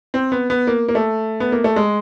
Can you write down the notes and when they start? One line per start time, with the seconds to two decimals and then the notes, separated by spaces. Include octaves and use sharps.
0.14 C4
0.32 B3
0.50 B3
0.67 A#3
0.88 A#3
0.95 A3
1.40 B3
1.52 A#3
1.64 A3
1.76 G#3